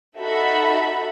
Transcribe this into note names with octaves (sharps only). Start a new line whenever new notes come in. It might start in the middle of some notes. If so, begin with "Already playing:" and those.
D#4 F#4 A4 E5 B5